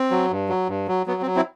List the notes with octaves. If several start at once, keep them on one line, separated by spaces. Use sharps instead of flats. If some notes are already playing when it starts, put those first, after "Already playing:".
Already playing: C4
F#3
G2
F#3
G2
F#3
F#3 B3
C4
F#3
C4 E4